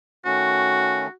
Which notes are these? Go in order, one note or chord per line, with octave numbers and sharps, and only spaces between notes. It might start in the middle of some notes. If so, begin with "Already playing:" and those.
D#3 A3 C#4 F#4